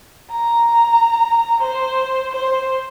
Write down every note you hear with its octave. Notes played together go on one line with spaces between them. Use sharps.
A#5
C5
C5